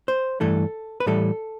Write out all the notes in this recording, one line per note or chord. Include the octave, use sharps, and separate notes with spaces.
C5
G2 E3 A3 A4
B4
A2 E3 G3 A4